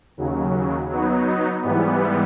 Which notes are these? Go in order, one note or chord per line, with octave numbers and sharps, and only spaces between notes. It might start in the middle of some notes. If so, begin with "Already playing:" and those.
D#2 C#3 F#3
F#3 B3 D#4
G#2 E3 G3 B3